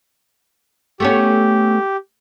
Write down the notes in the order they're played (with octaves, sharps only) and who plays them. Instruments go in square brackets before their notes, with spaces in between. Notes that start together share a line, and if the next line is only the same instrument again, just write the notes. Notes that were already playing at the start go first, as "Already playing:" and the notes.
[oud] A3 B3 C#4 [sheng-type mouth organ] G4